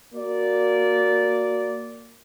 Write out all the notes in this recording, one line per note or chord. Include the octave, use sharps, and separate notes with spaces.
A#3 F#4 D5